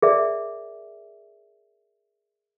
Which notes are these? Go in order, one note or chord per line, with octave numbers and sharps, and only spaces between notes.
G#4 A#4 D5 E5